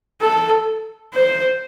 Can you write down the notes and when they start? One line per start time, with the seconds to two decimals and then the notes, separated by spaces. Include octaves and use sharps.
0.22 A4
1.15 C5